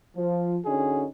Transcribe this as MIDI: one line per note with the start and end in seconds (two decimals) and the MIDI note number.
0.17 0.59 53
0.65 1.06 50
0.65 1.06 61
0.65 1.06 63
0.65 1.06 66
0.65 1.06 68